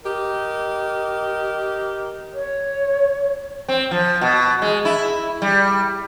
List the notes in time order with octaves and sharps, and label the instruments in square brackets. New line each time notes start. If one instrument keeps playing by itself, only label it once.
[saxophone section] G4 A#4 D#5
[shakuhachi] C#5
[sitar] C4
F3
B2
G#3
E4
G3